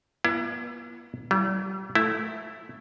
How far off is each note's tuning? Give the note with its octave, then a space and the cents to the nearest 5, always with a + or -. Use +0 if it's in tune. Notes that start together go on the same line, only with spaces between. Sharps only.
B3 -40 E4 +35 D5 +40
G3 -40 E4 +25
A3 +0 E4 +0